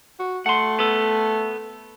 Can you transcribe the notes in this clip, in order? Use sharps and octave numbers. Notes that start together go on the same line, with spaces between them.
F#4
A3 F#5 C6
B3 A4